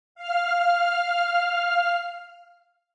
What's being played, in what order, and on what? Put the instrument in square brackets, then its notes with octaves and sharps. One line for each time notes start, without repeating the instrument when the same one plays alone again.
[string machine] F5 F6